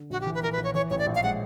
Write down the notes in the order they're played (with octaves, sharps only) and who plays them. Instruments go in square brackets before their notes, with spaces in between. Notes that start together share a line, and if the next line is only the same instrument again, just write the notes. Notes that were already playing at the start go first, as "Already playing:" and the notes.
Already playing: [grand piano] D3
[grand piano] A#1 [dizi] F#4
[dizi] G4
[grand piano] E3
[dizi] B4
[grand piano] A#1 [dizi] A#4
[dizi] B4
[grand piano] A#1
[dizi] C#5
[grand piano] E3 [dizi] C#5
[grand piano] A1 [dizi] C#5
[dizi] D5
[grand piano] A#1
[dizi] F5
[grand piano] G#3 [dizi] F#5